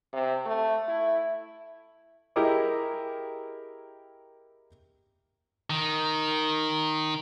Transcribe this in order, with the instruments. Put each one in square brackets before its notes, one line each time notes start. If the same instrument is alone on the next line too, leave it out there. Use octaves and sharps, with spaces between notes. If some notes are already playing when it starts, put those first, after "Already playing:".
[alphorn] C3
A3
E4
[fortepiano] E4 G4 G#4 A#4 D#5 D6
[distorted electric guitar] D#3